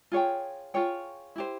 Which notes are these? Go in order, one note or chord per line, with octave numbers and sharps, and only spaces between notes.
F4 G#4 C#5 G5
F4 G#4 C#5 G5
E4 G4 C5